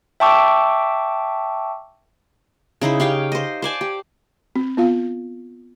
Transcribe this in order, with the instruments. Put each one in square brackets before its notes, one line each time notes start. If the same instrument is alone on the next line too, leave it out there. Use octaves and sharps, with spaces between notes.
[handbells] E5 G5 A5 C#6 D6 E6
[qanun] C#3 D#4 E4 C5
C#4 G4 F5 G5
C5 D#5
C5 D5 G#5 A5
G4
[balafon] C4
B3 F4 F5